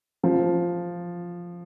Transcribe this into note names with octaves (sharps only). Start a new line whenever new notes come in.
F3